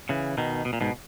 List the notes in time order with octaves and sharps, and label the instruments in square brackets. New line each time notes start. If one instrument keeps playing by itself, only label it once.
[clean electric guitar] C#3 E3
B2 D#3
B2
A#2
G#2 B2